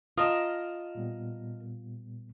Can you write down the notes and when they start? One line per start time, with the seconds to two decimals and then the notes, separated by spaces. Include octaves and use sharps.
0.18 F4 A#4 D#5 A5 D#6
0.95 A#2 G3 B3